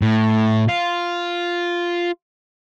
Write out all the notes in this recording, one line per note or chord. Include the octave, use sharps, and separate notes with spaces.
A2
F4